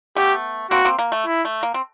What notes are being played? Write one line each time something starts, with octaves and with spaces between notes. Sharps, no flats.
A3 B3 G4
A#3 C4 F#4
A#3 C4
A#3
A3
E4
A3
A#3
C4